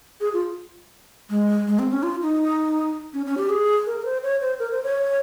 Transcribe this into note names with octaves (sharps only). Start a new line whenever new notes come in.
G#4
F4
G#3
G#3
C4
C#4
F4
D#4
C#4
C#4
G4
G#4
A#4
A#4
C5
C#5
C5
A#4
C5
C#5